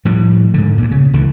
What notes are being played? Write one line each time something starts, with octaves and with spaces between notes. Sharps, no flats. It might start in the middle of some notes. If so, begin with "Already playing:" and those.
A2 F3 G3
G#2 D3
D2 A#2
C#3
C#2 D3 E3